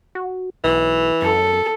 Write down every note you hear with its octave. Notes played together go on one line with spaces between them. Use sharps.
F#4
B1 E3
F#2 A4